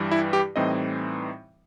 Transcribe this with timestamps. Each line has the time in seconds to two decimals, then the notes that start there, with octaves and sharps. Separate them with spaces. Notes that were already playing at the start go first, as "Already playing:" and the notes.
Already playing: G2 E3 G3
0.11 E4
0.33 G4
0.56 A2 E3 G3 C4 D#4 D#5